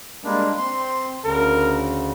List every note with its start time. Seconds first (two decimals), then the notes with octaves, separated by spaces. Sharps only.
0.24 G3 G#3 A#3 D4
0.58 C4 C6
1.25 D2 C#3 A#4